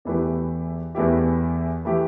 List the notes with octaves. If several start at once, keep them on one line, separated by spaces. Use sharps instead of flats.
E2 E3 A3 E4 G4
E2 E3 A3 E4 G4
E3 A3 E4 G4